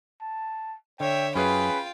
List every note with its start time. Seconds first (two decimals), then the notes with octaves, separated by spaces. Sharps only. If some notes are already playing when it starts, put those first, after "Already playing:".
0.22 A5
1.00 D3 C#5 E5 G5
1.35 F#2 C#4 F4 G#4 B4 G5 B5